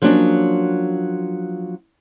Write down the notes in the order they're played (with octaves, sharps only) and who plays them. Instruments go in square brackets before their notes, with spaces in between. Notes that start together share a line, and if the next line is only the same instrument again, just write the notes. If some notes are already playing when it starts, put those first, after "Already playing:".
[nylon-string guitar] F3 F#3 A#3 C#4 D4